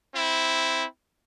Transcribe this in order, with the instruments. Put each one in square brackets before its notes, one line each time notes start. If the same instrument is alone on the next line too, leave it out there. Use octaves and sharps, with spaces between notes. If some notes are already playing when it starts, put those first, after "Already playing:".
[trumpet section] C4 E4